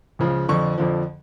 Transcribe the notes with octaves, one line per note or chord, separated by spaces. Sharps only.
C#2 C#3 F3
F2 D3 F3 C#6
F2 D3 F3